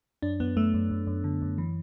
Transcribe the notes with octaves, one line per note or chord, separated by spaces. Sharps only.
F#2 D4
F#2 B3
F#2 A3
F#2
F#2
F#2
D3
F#2
E3